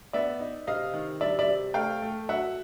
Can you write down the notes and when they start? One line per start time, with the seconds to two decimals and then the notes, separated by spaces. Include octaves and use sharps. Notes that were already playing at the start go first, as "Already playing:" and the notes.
0.13 B3 D5 E5
0.40 D#4
0.67 C3 D#5 F5
0.94 D#3
1.21 G3 D5 E5
1.39 D5 E5
1.48 C3
1.74 A3 F5 G5
2.02 A3
2.29 F#3 E5 F#5